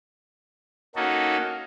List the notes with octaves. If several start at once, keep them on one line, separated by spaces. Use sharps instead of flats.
A#3 C#4 D#4 F#4 A4